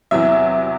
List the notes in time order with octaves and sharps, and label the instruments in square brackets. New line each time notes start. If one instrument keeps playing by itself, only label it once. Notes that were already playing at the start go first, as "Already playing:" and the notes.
[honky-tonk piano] E2 C3 F#3 E5